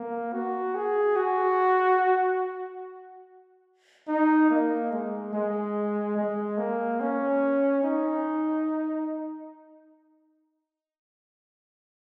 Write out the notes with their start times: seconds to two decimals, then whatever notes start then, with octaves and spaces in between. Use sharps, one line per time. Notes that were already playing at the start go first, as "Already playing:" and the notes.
Already playing: A#3
0.33 F#4
0.75 G#4
1.16 F#4
4.08 D#4
4.50 A#3
4.92 G#3
5.33 G#3
6.17 G#3
6.58 A#3
7.00 C#4
7.84 D#4